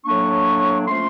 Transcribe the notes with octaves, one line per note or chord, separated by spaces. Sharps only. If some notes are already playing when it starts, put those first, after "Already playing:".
A2 F#3 A#3 D4 C#6
F3 A3 C#4 C6